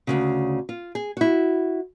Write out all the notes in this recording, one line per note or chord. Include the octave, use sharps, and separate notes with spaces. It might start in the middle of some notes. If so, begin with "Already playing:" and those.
D2 G#2 C#3
F4
G#4
E4 F#4